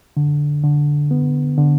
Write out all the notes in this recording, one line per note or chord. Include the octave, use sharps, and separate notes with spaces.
D3
D3
B3
D3